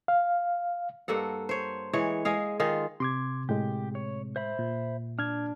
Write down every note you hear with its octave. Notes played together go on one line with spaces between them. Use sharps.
F5
G2 A#3 A4 F#5
C5 C#5
E3 G#3 C#5
G#3 G#4 F5
D#3 F4 G#4
C3 C6 D6 G#6
A2 G#3 G4
C#5
C5 E5 B5
A#2
D4 F6 G#6